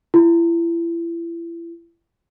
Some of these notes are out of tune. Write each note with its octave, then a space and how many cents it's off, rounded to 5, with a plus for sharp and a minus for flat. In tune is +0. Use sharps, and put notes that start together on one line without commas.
E4 +35